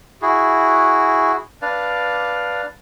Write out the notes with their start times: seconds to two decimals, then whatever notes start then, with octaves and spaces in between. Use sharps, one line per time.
0.22 E4 F#4 G#4
1.62 D4 B4 D5 F5